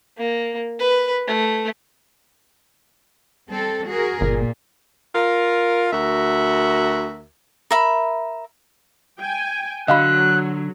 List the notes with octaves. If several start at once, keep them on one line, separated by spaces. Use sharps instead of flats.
A#3
B4
A3
G3 C4 A4
F#4 G#4 A#4
G1 A#2
F4 A#4
D2 F#4 A#4 E5
A#4 E5 B5
G5 G#5
D3 F#3 D#5 F5 B5 F#6